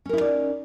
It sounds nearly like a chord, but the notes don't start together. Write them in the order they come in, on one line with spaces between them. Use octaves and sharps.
C#4 A#4 E4 D#4 D5